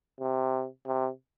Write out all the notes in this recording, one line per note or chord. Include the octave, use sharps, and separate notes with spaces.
C3
C3